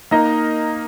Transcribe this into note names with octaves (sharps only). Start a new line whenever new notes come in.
A#3 D#4 A#4 D#5